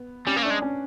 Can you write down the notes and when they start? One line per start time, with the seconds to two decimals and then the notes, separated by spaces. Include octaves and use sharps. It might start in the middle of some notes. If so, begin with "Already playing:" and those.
Already playing: B3
0.27 G3 C#4
0.37 A#3
0.43 A3 D4
0.50 G#3
0.62 C#4